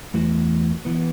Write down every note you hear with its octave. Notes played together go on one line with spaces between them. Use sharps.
E2 E3 A3 E4 F#4
E3 B3